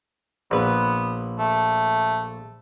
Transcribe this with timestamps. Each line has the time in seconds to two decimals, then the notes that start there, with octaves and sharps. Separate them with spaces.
0.51 A#1 B3 B4
1.39 A3